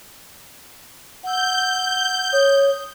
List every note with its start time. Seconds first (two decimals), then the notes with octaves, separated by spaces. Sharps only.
1.23 F#5 E6 G6
2.33 C#5 D#6